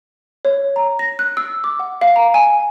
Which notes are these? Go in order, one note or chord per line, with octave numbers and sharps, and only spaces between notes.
C#5
A#5
A#6
F#6
E6
D6
F#5
F5
A#5
G#5